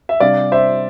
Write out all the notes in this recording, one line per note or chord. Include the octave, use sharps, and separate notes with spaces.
E5
C3 G3 D4 D5 F5
C5 E5